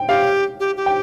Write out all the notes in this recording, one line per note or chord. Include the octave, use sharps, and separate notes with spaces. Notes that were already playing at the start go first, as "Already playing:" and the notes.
Already playing: G5
G4 F5
G4
G4
G5